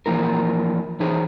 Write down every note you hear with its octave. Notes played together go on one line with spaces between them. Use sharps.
E3 F3 A#3 E4 A#4
E3 D#4 G#4 C5